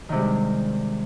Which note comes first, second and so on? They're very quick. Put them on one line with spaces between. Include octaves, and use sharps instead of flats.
D#3 C3 G#3 G3 D4